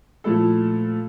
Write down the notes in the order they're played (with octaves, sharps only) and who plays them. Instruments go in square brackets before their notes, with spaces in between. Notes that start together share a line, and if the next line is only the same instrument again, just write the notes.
[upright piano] A#2 F3 A3 E4 A4